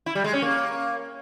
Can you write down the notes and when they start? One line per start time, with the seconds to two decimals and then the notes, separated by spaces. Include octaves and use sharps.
0.06 E4
0.15 G3
0.24 G#3
0.33 C#4
0.42 A#3